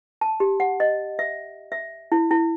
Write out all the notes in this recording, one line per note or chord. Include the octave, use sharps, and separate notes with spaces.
A5
G4
F#5
D#5
E5
E5
E4
E4